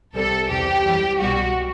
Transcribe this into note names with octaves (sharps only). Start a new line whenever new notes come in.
C2 C3 G3 A4
E2 C3 G3 G4
F#2 E3 G3
C2 B2 G3 F#4